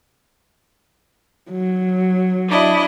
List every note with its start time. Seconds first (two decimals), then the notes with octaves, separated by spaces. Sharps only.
1.51 F#3
2.49 D4 E4 D#5